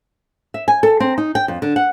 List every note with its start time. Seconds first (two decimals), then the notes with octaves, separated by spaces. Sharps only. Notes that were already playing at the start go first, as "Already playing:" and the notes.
0.54 E5
0.68 G#5
0.83 A4
1.00 C4
1.18 D#4
1.35 G5
1.48 F2
1.62 D3
1.76 F#5